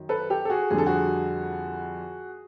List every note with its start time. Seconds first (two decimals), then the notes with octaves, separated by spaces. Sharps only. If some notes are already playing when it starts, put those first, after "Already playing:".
Already playing: F#2 D#3 F#3
0.09 A4 B4
0.30 G4 A4
0.45 A4
0.50 F#4 G#4
0.70 F2 D3 G3 G#4
0.78 A4
0.86 F#4 G#4